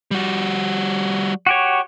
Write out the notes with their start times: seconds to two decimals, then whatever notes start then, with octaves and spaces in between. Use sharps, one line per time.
0.11 G3 F#4
1.46 F#4 G4 C#5